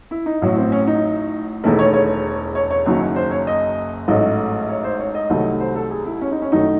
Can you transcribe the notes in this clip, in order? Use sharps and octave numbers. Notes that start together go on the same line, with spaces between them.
E4
D#4
A1 A2 F#3
C4
C#4
D#4
E1 E2 D#3 A3 E4
C#5
C#5
C#5
C#5
F#1 F#2 D#3 F#3
C5
C#5
D#5
A1 G#2 F#3 A3 D#5
C#5
C5
C#5
D#5
C2 C3 D#3 F#3 A3
C5
A4
G#4
E4
C#4
D#4
C#4
F#2 D#3 F#3 A3 D#4